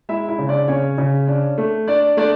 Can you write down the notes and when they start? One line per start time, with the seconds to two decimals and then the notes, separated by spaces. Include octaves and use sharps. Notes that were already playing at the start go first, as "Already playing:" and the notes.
0.09 G#3 E4 E5
0.28 E4 E5
0.38 C#3
0.48 D4 D5
0.68 C#3 C#4 C#5
0.98 C#3
1.27 D4
1.58 A3
1.88 D4 D5
2.17 A3 D4 D5